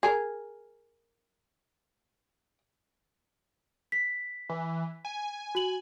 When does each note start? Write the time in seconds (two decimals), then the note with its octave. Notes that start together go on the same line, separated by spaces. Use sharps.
0.03 G#4 A#4
3.92 B6
4.49 E3
5.05 G#5
5.55 F#4 F#7